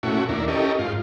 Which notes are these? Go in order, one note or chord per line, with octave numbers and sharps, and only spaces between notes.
A#2 A3 C#4 E4 F#4
D#2 D4 E4 A#4
C#4 E4 G4 A4 A#4 D#5
G#2 F4